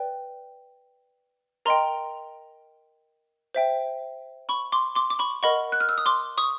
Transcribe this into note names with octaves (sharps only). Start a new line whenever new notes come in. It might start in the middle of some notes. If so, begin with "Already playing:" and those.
Already playing: B4 D5 G5
A#4 D#5 G5 A#5 C6
C5 E5 G5
B5 C#6
C6 D6
C6 D6
D6
B5 C#6
A#4 D#5 F#5 B5 C#6
F#6
F6
E6
D#6
C6 D6
C#6 D#6